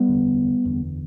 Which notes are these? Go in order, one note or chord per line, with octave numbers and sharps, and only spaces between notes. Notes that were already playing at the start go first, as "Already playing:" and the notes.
Already playing: G3 B3
F#1 E2 D3
F#1 E2 D3